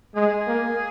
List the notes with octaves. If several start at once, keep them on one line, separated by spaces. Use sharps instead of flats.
G#3 G#4
A#3